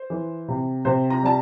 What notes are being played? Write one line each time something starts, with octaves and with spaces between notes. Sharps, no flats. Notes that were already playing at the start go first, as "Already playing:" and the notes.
Already playing: C5
E3
C3
C3 C5
A#5
G3 A5